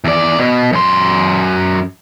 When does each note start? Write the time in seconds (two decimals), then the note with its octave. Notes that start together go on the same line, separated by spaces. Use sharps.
0.04 E2 D5
0.39 B2
0.73 F#2 C6